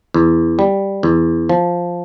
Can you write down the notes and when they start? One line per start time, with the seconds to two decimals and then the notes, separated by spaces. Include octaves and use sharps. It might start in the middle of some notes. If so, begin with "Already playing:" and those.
0.14 E2
0.59 G3
1.03 E2
1.49 F3